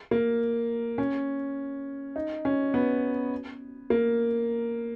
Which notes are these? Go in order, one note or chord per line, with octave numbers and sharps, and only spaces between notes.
A#3
C#4
D#4
C#4
B3
A#3